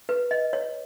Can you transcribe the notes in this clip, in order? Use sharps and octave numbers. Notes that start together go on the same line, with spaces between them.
B4
D#5
C#5